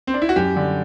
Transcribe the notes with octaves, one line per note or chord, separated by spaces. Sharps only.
C4
D4
E4
F#4
F#2 G4
D3 G3